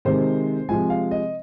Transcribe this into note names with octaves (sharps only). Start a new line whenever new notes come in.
C3 D#3 G#3 C5
C3 F3 G#3 G#5
F5
D#5